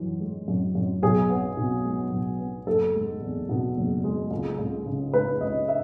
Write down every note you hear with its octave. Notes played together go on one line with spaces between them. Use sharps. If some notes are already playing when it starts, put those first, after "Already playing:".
Already playing: F#2 E3
G#3
F#2
F#2
B1 G#4
B3
B2
G#3
B1
B3
F#1 A4
G#3
E2
B2
F#1
G#3
C#2
C#2
C#3
G#3 B4
C#2 D#5
E5